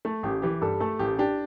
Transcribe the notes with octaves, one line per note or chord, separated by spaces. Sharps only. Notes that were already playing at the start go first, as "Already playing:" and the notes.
A3 A4
A1 G4
E3 G4
G2 A4
A3 A4
A1 G4
D4 G4